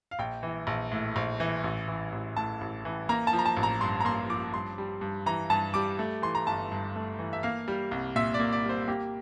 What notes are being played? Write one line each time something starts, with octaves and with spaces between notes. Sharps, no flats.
F5
A#1 G5
E3
A#1
A2
A#1
E3
A1
E3
A1
A2 A5
A1
E3
A#3 A#5
A5
F3
A#5
A5
A1
A#5
G2 C6
A#5
A#3 C6
F3 D6
G2 C6
G3
G2
E3 A#5
G2 A5
G3 D6
A3
E3 C6
A#5
G1 A5
G2
A3
E3
E5
A#3 F5
G3
C2
A#2 E5
D5
A#3
D5
G3 C5
A#3 G4